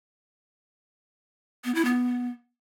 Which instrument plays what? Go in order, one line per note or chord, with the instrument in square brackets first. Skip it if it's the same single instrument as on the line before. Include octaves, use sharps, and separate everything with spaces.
[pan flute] B3
E4
B3